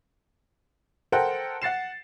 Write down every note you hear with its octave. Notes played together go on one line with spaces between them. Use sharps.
A4 A#4 C5 F#5 G5
F#5 A6 C7 E7